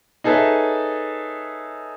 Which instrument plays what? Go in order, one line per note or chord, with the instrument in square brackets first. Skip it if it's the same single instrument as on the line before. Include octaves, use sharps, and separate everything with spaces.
[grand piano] D#4 G#4 A4 B4 C#5 E5